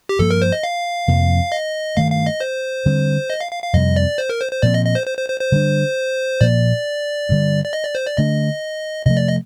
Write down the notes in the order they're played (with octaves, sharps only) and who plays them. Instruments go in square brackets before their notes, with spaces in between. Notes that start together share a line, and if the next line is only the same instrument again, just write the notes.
[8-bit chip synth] G4
[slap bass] G2 F3 A#3 [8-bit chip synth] A4
[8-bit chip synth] A#4
C5
D#5
F5
[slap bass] F2 C3 F3 A#3
[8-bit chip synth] D#5
[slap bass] G2 D#3 A3 [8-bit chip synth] F5
[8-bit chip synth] F5
D#5
C5
[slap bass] D3 G3 C4
[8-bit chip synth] D#5
F5
F5
F5
[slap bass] F2 C3 G3 [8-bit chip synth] D#5
[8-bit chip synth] D5
C5
A#4
C5
C5
[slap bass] A#2 F3 C4 [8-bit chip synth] D5
[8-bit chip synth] D#5
D#5
C5
C5
C5
C5
C5
[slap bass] D3 G3 D4
[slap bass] A#2 F3 A#3 [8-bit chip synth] D5
[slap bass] G2 D3 G3
[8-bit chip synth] D5
D#5
D5
C5
D5
[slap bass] D3 A3 D4 [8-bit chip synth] D#5
[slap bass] C3 F3 A3 [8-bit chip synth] D#5
[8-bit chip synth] D5
D#5